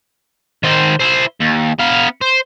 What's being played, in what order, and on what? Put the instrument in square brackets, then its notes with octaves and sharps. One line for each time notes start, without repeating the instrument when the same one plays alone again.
[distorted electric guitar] D#3 C5
E4 C5
D#2
B3 F5
C5